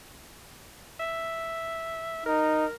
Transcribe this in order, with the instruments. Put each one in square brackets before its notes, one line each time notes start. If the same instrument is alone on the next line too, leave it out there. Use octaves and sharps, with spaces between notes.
[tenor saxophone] E5
[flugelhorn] D#4 [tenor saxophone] A#4